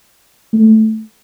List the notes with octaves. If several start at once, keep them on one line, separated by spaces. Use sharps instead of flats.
A3